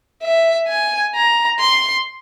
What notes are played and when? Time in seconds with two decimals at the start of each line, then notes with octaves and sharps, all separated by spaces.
0.23 E5
0.68 G#5
1.15 A#5
1.60 C6